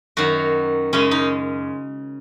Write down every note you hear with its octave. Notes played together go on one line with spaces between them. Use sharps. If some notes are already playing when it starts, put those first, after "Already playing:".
F#2 D#3 F#3 F#4
F#2 C#3 G#3 C#4
D#4